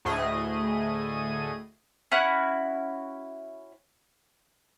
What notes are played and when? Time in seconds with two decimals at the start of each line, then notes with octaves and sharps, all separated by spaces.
0.05 D2 A2 A3 G#4 D#5 D#7
2.12 C#4 E4 F#4 F#6